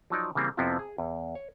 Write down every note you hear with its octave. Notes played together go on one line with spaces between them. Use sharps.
F3 F#3 D#4 D5
C#3 E3 G3 A#3 C4
F2 C3 F3 B3 C4 E4
G#4
E2
C#5